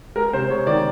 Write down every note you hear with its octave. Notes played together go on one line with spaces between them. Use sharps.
G#3 A#4
C3 C5
G#3 C#5
D#3 D5